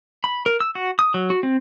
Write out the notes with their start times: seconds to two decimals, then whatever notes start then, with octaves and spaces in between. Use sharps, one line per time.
0.24 B5
0.46 A#4
0.60 E6
0.75 F#4
0.99 D#6
1.14 F#3
1.30 F#4
1.43 C4